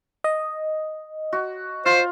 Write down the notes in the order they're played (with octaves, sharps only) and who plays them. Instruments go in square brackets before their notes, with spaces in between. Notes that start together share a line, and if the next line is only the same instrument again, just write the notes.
[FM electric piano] D#5
[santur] F#4
[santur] F4 [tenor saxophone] C5